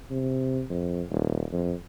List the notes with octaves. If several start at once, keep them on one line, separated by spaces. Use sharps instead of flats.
C3
F2
D#1
F2